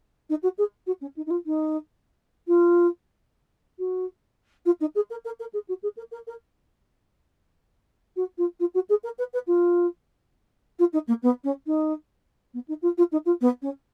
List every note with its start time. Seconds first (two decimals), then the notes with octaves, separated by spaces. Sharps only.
0.29 D#4
0.43 F#4
0.58 G#4
0.86 F#4
1.01 C#4
1.16 D#4
1.26 D#4
1.30 F4
1.46 D#4
2.47 F4
3.78 F#4
4.65 F4
4.80 D#4
4.95 G#4
5.10 A#4
5.25 A#4
5.39 A#4
5.53 G#4
5.68 F#4
5.82 G#4
5.97 A#4
6.11 A#4
6.27 A#4
8.16 F#4
8.38 F4
8.60 F4
8.74 F#4
8.89 G#4
9.03 A#4
9.18 B4
9.33 B4
9.47 F4
10.79 F4
10.93 D#4
11.07 A#3
11.22 B3
11.44 C#4
11.66 D#4
12.54 B3
12.68 D#4
12.82 F4
12.97 F4
13.12 D#4
13.25 F4
13.41 B3
13.62 C#4